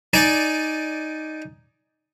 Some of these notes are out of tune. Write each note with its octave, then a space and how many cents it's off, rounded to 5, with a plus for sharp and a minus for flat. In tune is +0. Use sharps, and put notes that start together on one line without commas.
D#4 +0 D5 +0 G#5 +15